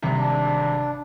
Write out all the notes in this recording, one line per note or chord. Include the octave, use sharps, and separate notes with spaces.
G#1 G2 C3
D4